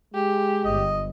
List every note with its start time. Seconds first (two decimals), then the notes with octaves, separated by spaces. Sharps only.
0.14 G#3 G4
0.65 G1 D#5